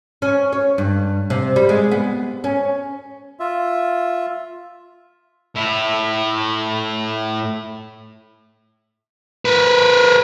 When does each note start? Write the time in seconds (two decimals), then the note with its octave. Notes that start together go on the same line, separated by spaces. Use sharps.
0.22 C#4
0.52 C#5
0.78 G2
1.30 C3
1.56 G3
1.69 G#3
1.91 B3
2.44 C#4
3.40 F4 E5
5.55 A2 E4
9.45 A#4 B4